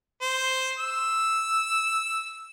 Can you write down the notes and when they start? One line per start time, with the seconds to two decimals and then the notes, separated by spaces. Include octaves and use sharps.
0.22 C5
0.79 E6